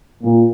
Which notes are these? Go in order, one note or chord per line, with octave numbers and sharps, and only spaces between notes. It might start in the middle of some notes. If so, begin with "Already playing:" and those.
A#2